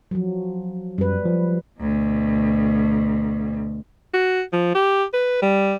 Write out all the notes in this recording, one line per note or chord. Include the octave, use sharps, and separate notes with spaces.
F3 F#3
F#2 G3 B4
F3
D2 B2
F#4
F3
G4
B4
G3